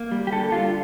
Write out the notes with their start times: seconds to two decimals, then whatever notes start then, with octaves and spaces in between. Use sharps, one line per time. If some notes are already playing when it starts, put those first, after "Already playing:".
Already playing: A#3
0.12 G3
0.27 G4
0.32 D3 A4
0.52 D3 F4